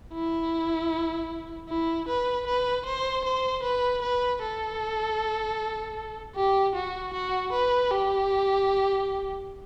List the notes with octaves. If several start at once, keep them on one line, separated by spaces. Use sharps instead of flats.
E4
E4
B4
B4
C5
C5
B4
B4
A4
G4
F#4
F#4
B4
G4